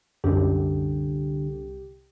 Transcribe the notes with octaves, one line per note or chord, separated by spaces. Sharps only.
C2 F#2 D3 G4